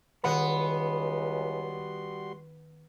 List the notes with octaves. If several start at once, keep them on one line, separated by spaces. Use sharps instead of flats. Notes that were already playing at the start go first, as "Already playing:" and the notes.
C#2 D#3 G3 B3 F#4 F#5 B5 C6